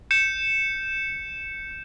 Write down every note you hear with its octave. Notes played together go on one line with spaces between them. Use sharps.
G6 C#7 E7